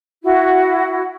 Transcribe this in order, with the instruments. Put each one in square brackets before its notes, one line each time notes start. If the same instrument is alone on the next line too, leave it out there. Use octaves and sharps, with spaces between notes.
[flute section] E4 F#4